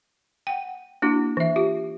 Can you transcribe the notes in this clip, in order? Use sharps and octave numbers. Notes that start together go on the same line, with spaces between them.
F#5 G5
A#3 D4 E4 F#4
E3 E5
F4 G4